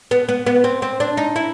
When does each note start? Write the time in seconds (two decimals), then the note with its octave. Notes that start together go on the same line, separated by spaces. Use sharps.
0.11 B3
0.29 B3
0.46 B3
0.64 C4
0.82 C4
1.00 D4
1.17 D#4
1.36 E4